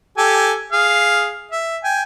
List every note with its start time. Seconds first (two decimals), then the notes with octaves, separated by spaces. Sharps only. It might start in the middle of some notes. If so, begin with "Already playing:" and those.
0.17 G4 A4 G#5
0.72 G#4 F5
1.52 E5
1.84 G5 G#5